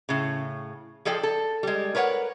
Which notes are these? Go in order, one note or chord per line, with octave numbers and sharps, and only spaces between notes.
A2 C#3
F3 G#4 A4 D5 G5
A4
G3 G#3
A#4 B4 C#5 D5 F#5